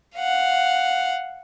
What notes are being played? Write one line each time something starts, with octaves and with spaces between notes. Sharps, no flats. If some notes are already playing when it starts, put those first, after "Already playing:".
F5 F#5